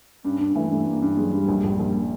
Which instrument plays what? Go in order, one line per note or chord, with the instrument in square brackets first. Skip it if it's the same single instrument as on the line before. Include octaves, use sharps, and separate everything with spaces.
[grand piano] G2 [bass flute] C#4
[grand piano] G2 [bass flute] D4
[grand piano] E3 [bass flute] A3
[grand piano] G2 [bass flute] A3
[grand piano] G2 [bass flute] A#3
[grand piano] G2
[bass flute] F#3 [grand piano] G#3
[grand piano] G2 [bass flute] G3
[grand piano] A#1
A#1
A#1